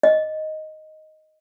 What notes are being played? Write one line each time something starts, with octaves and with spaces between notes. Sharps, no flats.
D#5